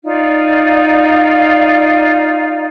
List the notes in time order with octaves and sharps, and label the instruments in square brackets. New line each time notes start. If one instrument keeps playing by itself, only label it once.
[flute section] D#4 F4 D5 F5